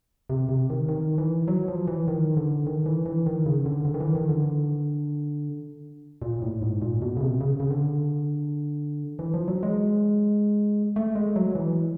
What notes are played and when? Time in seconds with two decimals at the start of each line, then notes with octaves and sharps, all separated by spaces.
0.30 C3
0.49 C3
0.70 D#3
0.88 D#3
1.18 E3
1.48 F#3
1.68 F3
1.87 E3
2.08 D#3
2.37 D3
2.67 D#3
2.86 E3
3.06 E3
3.26 D#3
3.46 C#3
3.66 D3
3.85 D3
3.94 D#3
4.00 E3
4.15 D#3
4.29 D3
6.22 A#2
6.42 A2
6.62 G#2
6.82 A#2
7.02 B2
7.17 C#3
7.21 C3
7.41 C#3
7.60 C#3
7.71 D3
9.19 E3
9.34 F3
9.48 F#3
9.63 G#3
10.96 A3
11.15 G#3
11.36 F#3
11.55 E3